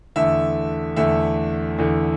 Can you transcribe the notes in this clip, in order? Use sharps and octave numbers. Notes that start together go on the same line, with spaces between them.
E2 D3 A3 E5
E2 D3 A3 E5
E2 D3 A3